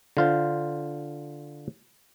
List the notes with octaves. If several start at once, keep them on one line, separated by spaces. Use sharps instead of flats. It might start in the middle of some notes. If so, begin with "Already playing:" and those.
D3 F4 C5